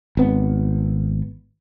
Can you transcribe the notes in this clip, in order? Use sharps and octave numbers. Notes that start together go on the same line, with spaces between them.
G#1 B3